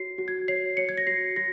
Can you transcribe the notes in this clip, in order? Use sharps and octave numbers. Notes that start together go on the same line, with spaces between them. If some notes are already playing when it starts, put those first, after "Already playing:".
Already playing: F#4 C#5 C7
F#4
G#6
C#5 C7
C#5 C#7
G#6
A#6
F#4 C7
F#4 A#6